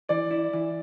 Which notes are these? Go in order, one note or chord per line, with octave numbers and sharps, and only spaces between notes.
E3 D5
E4
E3